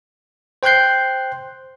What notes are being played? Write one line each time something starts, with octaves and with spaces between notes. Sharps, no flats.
C5 G5 C6 F#6 G6 C7